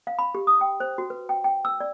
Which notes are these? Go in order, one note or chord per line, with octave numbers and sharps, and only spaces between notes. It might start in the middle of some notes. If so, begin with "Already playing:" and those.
F5
B5
G4
D#6
G5
C5
F#4
B4
G5
G5
E6
D5